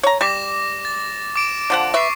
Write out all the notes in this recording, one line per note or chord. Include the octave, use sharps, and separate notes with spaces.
C#5 A#5
G3 D6 A#6 E7
A6
D6 D7 E7
D3 F3 F#5
B4 E5 C#6 C7